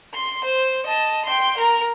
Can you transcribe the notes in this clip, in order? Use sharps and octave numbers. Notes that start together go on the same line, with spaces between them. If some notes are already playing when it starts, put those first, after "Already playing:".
C6
C5
D#5 A5
G5 C6
A#4 A#5